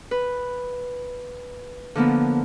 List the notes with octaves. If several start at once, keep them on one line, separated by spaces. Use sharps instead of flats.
B4
D3 F3 A#3 B3